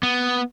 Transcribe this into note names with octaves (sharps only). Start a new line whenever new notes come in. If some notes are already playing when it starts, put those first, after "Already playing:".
B3